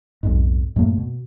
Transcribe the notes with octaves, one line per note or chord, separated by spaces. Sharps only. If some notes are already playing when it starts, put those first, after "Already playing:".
B1 F2 G#2
F#2 A2 A3 A#3
B2